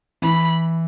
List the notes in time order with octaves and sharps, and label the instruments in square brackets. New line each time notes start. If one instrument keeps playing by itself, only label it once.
[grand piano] E3 [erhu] B5